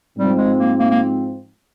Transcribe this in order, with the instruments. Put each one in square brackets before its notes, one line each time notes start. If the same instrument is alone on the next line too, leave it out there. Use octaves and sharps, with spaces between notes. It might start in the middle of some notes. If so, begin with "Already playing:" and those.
[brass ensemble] G#2 F3 C4 [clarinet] G3
[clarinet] G#3
A#3
A#3
A#3